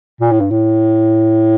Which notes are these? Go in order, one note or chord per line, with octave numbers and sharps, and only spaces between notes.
A#2
A2
G2
A2